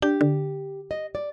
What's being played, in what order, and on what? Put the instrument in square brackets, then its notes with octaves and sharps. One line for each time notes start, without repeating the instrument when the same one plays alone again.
[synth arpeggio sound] D4 G6 [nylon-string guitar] G4
[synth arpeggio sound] D3
[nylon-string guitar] D#5
D5